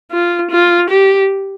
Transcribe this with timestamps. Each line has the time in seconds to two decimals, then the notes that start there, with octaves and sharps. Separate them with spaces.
0.12 F4
0.51 F4
0.90 G4